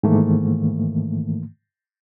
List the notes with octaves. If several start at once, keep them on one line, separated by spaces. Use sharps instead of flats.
G#2 D#3 E3 A3 A#3